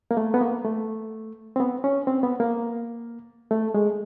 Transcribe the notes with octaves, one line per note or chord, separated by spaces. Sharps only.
A#3
A3
B3
A#3
A3
C4
B3
C#4
C4
B3
A#3
A3
G#3